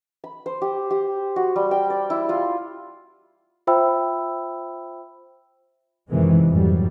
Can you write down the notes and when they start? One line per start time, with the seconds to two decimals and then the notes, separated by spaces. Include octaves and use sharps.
0.24 B5
0.46 C5
0.62 G4
0.91 G4
1.36 F#4
1.56 G3
1.71 G5
1.90 D5
2.10 E4
2.29 F4
3.67 F4 C5 E5 G5 B5 E6
6.09 F#2 C3 D#3 E3 G#3
6.49 F2 G#2 F#3 G3